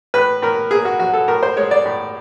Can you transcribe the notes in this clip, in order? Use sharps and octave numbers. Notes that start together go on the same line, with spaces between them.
A2 B4
A2 A#4
A#3 G#4
F#4
F#3 F#4
A4
A2 A#4
C5
G#3 C#5
D5
A2